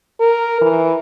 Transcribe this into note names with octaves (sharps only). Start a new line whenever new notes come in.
A#4
E3